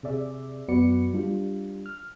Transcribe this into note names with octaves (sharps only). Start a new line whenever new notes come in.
C3 G#4 D5 E5
F#2 B3 F#4 B4 D5 C#7
G3 D4 F4
F6